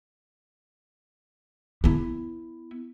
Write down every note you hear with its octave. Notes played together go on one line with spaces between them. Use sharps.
B3 E4